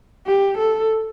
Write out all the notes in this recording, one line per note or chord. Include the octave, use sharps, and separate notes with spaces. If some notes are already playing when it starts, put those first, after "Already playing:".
G4
A4